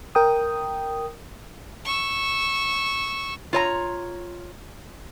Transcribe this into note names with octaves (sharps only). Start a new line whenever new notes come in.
A#4 G5 D#6
C#6 E6
F4 C#5 A#5